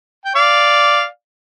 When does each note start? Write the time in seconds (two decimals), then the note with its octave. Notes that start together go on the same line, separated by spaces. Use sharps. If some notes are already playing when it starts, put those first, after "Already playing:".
0.25 G5
0.36 D5 F5